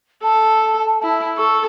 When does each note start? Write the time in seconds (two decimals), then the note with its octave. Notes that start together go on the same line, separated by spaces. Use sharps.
0.23 A4 A5
1.02 E4
1.37 A4 C#6